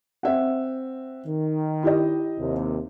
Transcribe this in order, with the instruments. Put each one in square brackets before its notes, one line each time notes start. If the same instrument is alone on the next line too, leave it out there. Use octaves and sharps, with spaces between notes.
[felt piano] C4 E5 F#5
[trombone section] D#3
[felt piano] E4 G4 D#5
[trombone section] D#2 C3